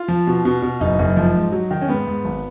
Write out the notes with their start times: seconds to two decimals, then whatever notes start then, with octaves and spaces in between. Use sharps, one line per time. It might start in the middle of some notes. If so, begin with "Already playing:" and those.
Already playing: F4
0.08 F3
0.27 B2
0.45 B2
0.62 B2
0.80 F#1 D#4
0.99 F#1
1.17 F3
1.35 G#2
1.52 F#3
1.71 D#3
1.81 C#4
1.89 G#2 B3
2.07 G#2
2.25 G#1